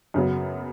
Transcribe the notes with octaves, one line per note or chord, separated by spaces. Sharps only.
F#2 C#3 F#3 B3